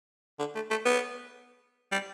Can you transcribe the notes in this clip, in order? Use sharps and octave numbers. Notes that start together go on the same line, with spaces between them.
D3
A3
A3
B3
G3